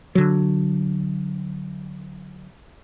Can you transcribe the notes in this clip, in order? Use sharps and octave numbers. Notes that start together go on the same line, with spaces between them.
D3 F#3